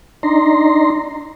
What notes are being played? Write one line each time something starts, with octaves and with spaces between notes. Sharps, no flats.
D4 D#4 A#5 C6